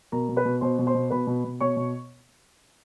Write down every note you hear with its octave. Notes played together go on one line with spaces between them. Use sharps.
B2 A#4 A#5
B2
B4 B5
B2
B2 C5 C6
B2
C5 C6
B2
B2 B4 B5
B2
B2
B2 C#5 C#6
B2